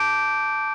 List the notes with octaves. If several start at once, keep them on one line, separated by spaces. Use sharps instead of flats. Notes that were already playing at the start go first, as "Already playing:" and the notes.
Already playing: A5 D6 G6 D7